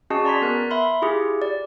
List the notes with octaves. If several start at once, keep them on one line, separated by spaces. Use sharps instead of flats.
C#4 F#4 G#4 D#5 A5
D5 A#5 C6 G#6 B6
B3 A#4 F#6
E5 B5 C6
E4 F4 G4 G#4
D5